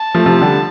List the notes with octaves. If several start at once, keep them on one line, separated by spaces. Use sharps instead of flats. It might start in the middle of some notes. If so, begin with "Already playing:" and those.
Already playing: A5
F3 A3
C3 F3
D3 G3